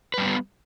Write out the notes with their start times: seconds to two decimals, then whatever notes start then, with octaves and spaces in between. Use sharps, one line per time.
0.14 B4
0.18 G3
0.22 C4
0.26 B3